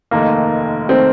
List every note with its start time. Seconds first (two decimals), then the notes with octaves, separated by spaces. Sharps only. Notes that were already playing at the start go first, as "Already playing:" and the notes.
0.11 F1 D#2 D#3 A3 A#3 D#4
0.89 D#3 A3 C4 D#4